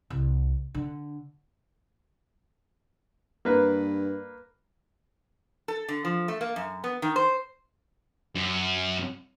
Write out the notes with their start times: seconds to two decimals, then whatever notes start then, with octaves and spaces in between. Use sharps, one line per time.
0.10 C2
0.74 D3
3.45 G2 A#3 B4
5.68 A4
5.89 D3
6.05 F3
6.28 A3
6.41 A#3
6.56 F#2
6.84 B3
7.02 D#3
7.16 C5
8.35 F#2